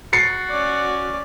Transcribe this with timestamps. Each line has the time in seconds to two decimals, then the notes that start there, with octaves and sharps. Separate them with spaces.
0.13 F#4 A6 C7 C#7
0.50 C#4 D5